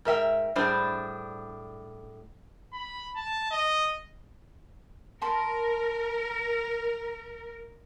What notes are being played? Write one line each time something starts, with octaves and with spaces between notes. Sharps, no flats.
G#2 A#4 E5 G5
A2 G3 D4 G#4 C5
B5
A5
D#5
A#4 A5 B5 C6